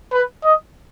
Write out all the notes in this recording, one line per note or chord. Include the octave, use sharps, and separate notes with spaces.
B4
D#5